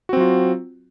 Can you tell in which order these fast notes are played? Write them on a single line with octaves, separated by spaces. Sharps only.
F#4 C4 F#3 F4